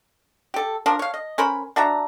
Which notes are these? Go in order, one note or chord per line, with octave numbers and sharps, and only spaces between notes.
G4 A4
F3 D4 A#4
C#5 F5
D#5
C#4 A#4 C5 B5
D4 F#4 E5 A#5